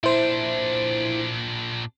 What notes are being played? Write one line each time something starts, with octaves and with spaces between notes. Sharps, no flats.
A#2 D4 E4 C5